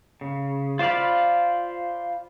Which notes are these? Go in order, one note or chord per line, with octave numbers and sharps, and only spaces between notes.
C#3
F4 C5 D5 F5 B5